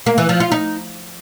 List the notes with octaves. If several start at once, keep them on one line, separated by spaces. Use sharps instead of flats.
A#3
E3
F3
F4
D#4